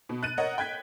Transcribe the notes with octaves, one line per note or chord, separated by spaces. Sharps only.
B2
F#6 A6 D#7
A#4 C#5 D#5 F#5
G5 F#6 G#6 B6